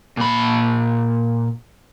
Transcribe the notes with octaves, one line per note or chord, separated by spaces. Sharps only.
A#2 B5